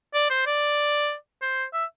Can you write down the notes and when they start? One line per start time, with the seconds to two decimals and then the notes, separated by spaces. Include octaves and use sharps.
0.14 D5
0.30 C5
0.47 D5
1.42 C5
1.73 E5